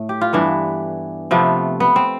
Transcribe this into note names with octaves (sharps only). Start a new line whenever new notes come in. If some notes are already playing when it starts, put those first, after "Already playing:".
Already playing: A2 A3
G4
F4
G2 E3 B3 D4
C3 F3 A3 B3
B3
C4